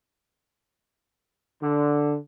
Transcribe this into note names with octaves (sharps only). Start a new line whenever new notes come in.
D3